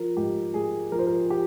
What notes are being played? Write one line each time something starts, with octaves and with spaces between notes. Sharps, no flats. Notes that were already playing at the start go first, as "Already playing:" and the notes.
Already playing: F3 A#4
G#2 G4
G#2 G#4
F3 A#4
C5
A#4
G4